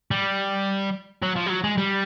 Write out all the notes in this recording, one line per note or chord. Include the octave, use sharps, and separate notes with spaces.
G3
F#3
F3
G3
F#3
G#3
G3